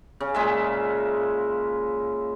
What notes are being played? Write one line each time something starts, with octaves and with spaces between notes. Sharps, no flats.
C#3
A#2 G#3 E5